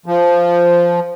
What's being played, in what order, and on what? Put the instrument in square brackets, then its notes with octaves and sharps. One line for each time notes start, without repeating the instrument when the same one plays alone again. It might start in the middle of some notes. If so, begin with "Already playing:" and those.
[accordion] F3